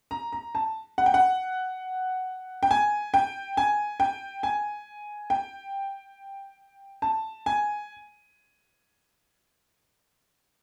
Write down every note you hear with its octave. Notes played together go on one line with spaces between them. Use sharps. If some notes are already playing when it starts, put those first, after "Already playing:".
A#5
A#5
A5
F#5
G5
F#5
G5
G#5
G5
G#5
G5
G#5
G5
A5
G#5